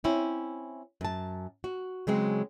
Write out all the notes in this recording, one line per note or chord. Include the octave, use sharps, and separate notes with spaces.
C4 C#4 E4
F#2 A5
F#4
C#3 F#3 G#3 C4